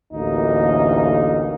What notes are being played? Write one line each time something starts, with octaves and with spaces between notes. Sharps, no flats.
A1 D2 A#3 D#4